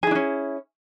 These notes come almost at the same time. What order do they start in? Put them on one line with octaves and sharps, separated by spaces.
G#4 E4 D4 C#4